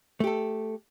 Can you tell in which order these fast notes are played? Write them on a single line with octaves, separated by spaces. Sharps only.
A3 G4 A4